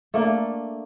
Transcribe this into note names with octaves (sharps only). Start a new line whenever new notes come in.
A3 A#3 D4